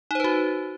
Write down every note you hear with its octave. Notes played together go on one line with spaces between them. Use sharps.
D#4 F#4 B4 C5